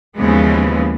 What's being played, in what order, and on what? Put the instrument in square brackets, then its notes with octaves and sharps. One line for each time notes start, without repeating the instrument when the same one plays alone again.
[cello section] D#2 C#3 E3 F3 G#3 B3